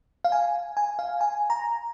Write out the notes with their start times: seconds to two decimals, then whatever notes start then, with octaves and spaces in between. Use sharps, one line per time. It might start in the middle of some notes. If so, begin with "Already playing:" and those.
0.25 F5
0.32 G#5
0.77 G#5
0.99 F5
1.21 G#5
1.50 A#5